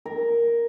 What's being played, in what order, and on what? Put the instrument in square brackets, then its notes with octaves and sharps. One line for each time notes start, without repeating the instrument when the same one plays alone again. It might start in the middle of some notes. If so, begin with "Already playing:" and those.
[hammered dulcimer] A#4